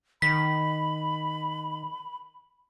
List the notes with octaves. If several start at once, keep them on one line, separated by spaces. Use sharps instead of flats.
D#3 B5 B6